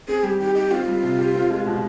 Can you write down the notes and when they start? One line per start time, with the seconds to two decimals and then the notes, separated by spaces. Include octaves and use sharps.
0.08 C4 G#4
0.23 G3 G4
0.40 D#3 G4
0.55 D#4 G4
0.71 C4 F4
0.87 G3
1.03 C3
1.18 G4
1.34 C4
1.50 G#3
1.66 B2